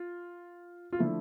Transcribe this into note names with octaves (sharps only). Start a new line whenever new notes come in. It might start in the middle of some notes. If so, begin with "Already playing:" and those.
Already playing: F4
F4
D3 F3 A3 E4